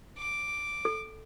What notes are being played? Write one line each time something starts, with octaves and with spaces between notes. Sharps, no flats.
D6
A4